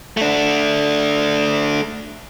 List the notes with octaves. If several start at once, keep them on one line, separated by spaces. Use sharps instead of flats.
A3 D4